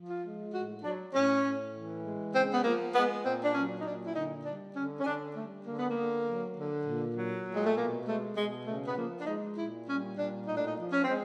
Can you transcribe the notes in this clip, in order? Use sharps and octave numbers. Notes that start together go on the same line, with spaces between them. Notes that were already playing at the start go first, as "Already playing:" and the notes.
Already playing: F3
F4
G#3
A2 F#4
F#3 D4
A2 C#4
A2
E3
G#3
C#3 C4
B3
F3 A#3
G#3 B3
A#2 C4
D4
F#3 C#4
D#4
A#2 D4
E4
D3 D#4
G3 D4
D3 C#4
C#4
D3 D4
G3 A3
D3 A#3
B3
A#3
D3
F#3
D3
A#2
F#3
A#2
G#3
A3
B2 A#3
G#3 A3
B2 G#3
C#3 A3
B3
F3 A#3
D4
G#3 D#4
A#2 E4
G3 C#4
A#2 D4
A2 D#4
D4
D#4
F3
C#4
G#3 C4